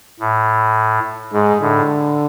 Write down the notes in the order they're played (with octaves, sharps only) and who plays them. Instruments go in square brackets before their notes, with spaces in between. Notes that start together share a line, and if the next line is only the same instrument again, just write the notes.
[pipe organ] A2
[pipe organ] G#2 [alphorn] G#3
[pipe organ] A2 [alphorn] D3